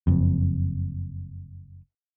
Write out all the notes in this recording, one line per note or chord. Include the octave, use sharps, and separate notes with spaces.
F#1 F2